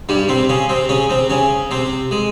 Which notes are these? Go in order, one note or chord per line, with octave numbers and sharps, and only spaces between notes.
G2 G3
C3 C4
C#3 C#4
C3 C4
C#3 C#4
C3 C4
C#3 C#4
C3 C4
G#3